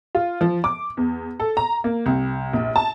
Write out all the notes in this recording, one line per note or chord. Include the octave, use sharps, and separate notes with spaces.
F4
F3
D6
E2
A4
A#5
A#3
C2
A#1
A5